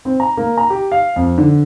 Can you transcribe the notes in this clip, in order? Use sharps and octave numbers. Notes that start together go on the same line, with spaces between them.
C4
A#5
A#3
A#5
G4
F5
F2
D3